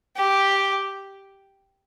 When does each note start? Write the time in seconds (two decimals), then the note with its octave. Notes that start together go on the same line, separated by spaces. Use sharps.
0.16 G4